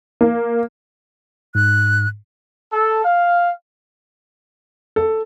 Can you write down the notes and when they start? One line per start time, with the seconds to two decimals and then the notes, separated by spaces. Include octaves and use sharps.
0.21 A#3
1.55 G#2 F#6
2.73 A4
3.05 F5
4.96 A4